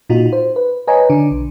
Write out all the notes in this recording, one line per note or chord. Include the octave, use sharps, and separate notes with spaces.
A#2 D#4 F4 F#4
C5
B4
B4 C#5 D#5 G#5 A#5
D3 D4
B1